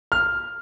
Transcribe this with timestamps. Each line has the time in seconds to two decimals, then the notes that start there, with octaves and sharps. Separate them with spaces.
0.12 F6